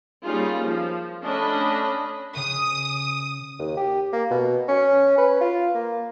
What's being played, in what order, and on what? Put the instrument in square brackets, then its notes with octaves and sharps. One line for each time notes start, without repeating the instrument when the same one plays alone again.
[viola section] G3 A#3 C#4 D#4 F4 G#4
F3
A3 C#4 D4 D#5 B5
[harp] C#3 [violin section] D#6
[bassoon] D#2
G4
A#3
B2
C#4
B4
F4
A#3